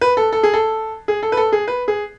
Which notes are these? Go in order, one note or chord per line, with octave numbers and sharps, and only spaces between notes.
B4
A4
A4
G#4
A4
G#4
A4
B4
A4
G#4
B4
G#4